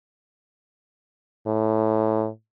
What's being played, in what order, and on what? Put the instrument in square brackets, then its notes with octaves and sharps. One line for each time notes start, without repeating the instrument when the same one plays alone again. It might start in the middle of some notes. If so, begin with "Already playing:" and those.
[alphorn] A2